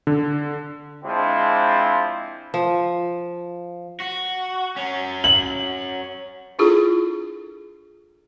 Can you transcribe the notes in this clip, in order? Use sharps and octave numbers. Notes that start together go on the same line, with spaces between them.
D3
F3 G#3 C4 D4 E4
F3
F#4
F#3 C#4
F#7
D4 E4 F4 G#4 A4